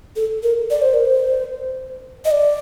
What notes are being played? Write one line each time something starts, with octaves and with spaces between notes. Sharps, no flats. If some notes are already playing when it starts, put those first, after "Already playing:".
A4
A#4
D5
C5
A#4
C5
D#5
D5